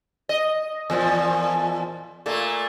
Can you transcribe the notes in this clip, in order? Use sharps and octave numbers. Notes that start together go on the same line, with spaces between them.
D#5
E2 A#2 F3
A#2 A3 A#3